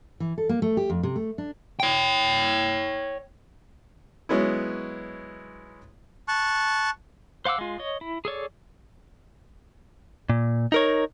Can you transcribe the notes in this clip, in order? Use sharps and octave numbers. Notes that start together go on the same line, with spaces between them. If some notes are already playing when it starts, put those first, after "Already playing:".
E3
A4
A#3
A3
G4
F2
C3
A3
D4
C#5 G5
F#3 G#3 B3 C#4 E4
A5 C#6 F#6
C5 F5 F#5 D6 E6
G#3 F4
C#5 D#5
E4
G#4 A4 C#5 D5
A#2
D#4 A#4 C#5